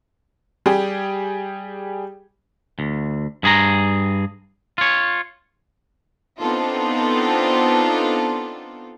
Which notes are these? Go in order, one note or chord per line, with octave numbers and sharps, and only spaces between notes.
G3 G4 G#4
D2
G2 G#4 A#5
F4 C#5
B3 C4 D4 D#4 F4 A4